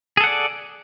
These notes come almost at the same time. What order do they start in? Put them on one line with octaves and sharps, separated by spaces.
G#4 A4 F#5 D5